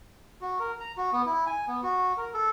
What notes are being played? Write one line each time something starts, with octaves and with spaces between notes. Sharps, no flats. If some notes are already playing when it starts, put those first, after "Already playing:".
F#4
A#4
A#5
F#4
B3
E4
G#5
B3
F#4
A#4
A4